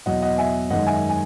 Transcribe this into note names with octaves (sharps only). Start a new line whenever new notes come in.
E2 B2 F#3 D#5 F#5
D#5 F#5
E5 G#5
F#2 D#3 G#3 D#5 F#5
E5 G#5
G#5